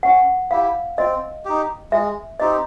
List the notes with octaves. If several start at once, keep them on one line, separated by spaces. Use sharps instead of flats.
C#4 F#5
E4 G4 F5
C4 D#5
D#4 G4
G#3 E5
C4 D#4 G4 D#5